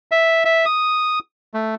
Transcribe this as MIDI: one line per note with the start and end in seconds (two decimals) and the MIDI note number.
0.11 0.44 76
0.45 0.65 76
0.66 1.19 87
1.54 1.75 57